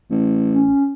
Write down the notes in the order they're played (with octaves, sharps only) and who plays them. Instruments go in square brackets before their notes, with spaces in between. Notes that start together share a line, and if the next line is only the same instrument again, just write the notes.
[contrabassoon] A1
[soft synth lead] C#4